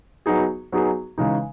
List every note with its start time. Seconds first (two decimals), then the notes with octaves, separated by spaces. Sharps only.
0.26 F#3 B3 D#4 G#4
0.72 F#3 B3 D#4 G#4
1.18 C#3 E3 G#3 D#4